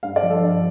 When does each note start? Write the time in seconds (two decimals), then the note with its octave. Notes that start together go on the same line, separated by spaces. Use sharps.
0.03 G2 F5
0.16 D5
0.23 F3
0.30 A4
0.43 G2